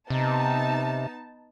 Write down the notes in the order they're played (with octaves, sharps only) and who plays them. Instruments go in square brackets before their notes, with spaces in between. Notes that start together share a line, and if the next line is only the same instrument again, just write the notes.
[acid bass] C3 [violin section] B3 D#4 A5